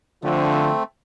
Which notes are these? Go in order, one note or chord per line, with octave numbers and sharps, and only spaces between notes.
D3 F3 A3 C4